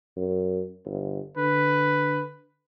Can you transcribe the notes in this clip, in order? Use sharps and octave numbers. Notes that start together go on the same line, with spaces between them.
F#2
G1
D3 B4